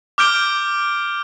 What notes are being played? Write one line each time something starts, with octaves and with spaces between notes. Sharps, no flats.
D6 F6 G6 D7 G7